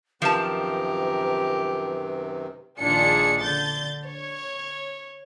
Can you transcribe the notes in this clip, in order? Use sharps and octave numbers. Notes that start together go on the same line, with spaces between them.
F#2 C3 D#3 F3 G4 A#4 B4 A5
A#1 D#3 D4 F4 G#4 C#7
D3 G6 A6
C#5